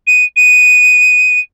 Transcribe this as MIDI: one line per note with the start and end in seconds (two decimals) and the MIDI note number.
0.07 0.25 99
0.36 1.39 99